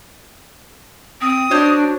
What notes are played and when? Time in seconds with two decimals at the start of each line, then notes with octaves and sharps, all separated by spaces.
1.21 C4 D#6
1.51 D4 F#4 C5 C#5